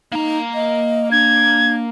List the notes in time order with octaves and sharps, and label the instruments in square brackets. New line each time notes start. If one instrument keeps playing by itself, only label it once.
[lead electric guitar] A#3 A#5 [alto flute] D#4
[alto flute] D#5
[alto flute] D4 [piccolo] G#6